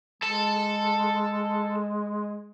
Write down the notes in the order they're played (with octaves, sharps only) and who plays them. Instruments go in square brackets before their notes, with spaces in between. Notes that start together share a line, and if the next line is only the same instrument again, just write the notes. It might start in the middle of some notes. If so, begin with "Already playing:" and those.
[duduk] G#3 [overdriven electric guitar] A4 A5